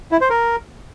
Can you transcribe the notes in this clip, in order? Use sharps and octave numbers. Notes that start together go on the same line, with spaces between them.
E4
C5
A#4